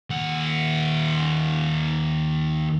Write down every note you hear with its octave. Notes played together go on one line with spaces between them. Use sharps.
D#2 F#5